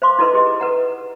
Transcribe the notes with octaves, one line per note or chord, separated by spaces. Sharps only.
C5 F5 C6 D6
D#4 E4 A4 B4 D#5 C6
G4 G#4 D#5
A4 B4 F#5 A#5